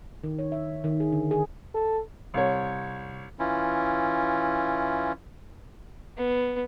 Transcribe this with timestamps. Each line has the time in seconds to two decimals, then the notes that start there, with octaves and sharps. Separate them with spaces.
0.24 D#3
0.39 C#5
0.52 E5
0.84 D#3
1.00 G#4
1.12 D3
1.31 G#4
1.75 A4
2.34 C2 C#5
3.39 E3 C#4 E4 F4
6.17 B3